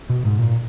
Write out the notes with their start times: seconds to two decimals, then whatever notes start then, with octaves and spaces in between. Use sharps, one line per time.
0.10 B2
0.25 G#2
0.39 A#2